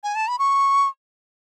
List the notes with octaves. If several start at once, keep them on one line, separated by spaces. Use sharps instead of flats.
G#5
A5
B5
C#6